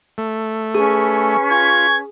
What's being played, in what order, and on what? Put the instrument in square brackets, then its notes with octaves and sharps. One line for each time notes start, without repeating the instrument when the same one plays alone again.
[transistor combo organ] A3
[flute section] C#4 B4 C#6 [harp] G#4
[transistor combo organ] F4 [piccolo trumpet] G#6